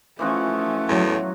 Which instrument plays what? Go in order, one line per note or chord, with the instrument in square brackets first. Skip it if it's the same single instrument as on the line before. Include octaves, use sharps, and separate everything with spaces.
[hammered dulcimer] E3 F3 F#4 [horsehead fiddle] A3 C#4
[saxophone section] E2 A2 [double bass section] F#3